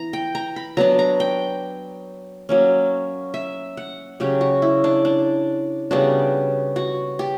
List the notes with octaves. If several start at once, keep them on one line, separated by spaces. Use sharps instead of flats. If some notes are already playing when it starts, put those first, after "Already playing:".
Already playing: E3 B3 A#5
G5
A#5
B5
F#3 B3 D4 A#5
A#5
G5
F#3 A#3 C#4
E5
F#5
C#3 F#3 C#4 G4
F#4
E4
D4
D4
C#3 G3 B3 D4 F#4
F#4
G4